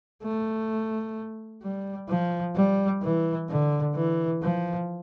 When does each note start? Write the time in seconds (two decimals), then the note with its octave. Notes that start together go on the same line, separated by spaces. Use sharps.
0.23 A3
1.62 G3
2.09 F3
2.55 G3
3.02 E3
3.49 D3
3.95 E3
4.42 F3